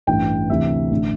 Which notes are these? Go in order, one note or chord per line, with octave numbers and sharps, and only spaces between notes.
A1 G2 E3 G5
D2 C3 E3 E5
A1 D3